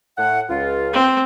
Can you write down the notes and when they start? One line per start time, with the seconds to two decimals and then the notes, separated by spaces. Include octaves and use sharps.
0.18 A2 A3 F#5
0.49 C#2 F4
0.93 C4